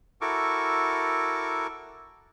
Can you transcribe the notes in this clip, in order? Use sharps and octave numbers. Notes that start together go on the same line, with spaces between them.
E4 F#4 A4 A#4 C#6 D6